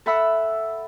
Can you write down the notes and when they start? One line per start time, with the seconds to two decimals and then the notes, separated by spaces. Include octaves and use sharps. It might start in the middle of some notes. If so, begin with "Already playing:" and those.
0.06 A4 E5 F#5 B5 E6